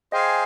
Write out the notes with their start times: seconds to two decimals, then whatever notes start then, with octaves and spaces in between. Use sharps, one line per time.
0.12 G#4 C5 D#5 F5 G5 G#5